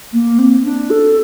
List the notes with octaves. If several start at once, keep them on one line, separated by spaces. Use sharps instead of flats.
A#3
C4
D4
A4